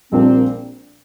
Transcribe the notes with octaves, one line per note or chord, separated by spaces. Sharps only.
A#1 A#2 G3 C4 D4 A#4